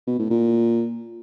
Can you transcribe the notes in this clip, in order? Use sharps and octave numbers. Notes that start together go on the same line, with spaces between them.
B2
A2
A#2